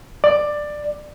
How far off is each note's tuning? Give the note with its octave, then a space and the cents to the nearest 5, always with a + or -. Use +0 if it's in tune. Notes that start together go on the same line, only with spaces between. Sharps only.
D5 +15